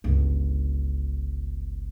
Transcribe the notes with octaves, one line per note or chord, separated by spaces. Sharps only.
G1 C#2